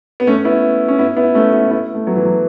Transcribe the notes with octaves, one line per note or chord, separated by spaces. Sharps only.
B3
A3 C#4
B3 E4
C#4
B3 E4
B3 E4
A3 C#4
B3 E4
B3 E4
A3
F#3 B3
E3
F#3